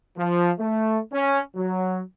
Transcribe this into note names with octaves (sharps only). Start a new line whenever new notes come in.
F3
A3
C#4
F#3